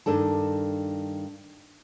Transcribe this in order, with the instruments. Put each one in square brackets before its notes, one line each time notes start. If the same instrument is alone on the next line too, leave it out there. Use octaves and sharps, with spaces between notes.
[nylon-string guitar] G2 D#3 D4 A4 A5